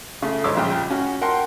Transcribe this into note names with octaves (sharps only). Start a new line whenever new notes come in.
C#3 A3
D2 G#3 C#5 C6 D6 E6
A#1 C#3 F4 G5
C#4 F#4
A#4 F#5 G5 A5 C6